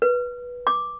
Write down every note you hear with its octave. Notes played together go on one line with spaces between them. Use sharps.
B4
D6